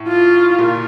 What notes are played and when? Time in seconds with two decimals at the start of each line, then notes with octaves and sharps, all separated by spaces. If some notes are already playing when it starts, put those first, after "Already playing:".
Already playing: A2
0.08 F4
0.58 A#2